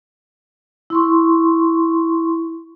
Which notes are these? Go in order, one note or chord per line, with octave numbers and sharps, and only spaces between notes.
E4 C6 C#6